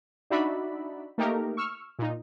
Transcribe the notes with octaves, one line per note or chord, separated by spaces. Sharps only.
D4 D#4 F#4 D5 E5 B5
A3 A#3 D#4 G4 A#4
C#6 E6 F6
A#2 D#4